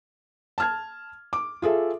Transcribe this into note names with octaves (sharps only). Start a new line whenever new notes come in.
A5 F6 G#6
D6
F4 G#4 A4 E5